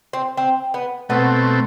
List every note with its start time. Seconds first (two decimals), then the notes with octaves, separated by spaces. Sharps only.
0.13 C4
0.37 C4
0.74 B3
1.09 B2 A3 B3 C4